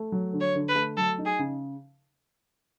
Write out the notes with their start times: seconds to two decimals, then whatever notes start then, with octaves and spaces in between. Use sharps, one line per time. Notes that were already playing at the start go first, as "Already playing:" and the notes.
Already playing: A3
0.12 F#3
0.33 D3
0.41 C#5
0.55 D3
0.69 B4
0.75 A3
0.97 F#3 A4
1.18 D#4
1.26 G#4
1.39 C#3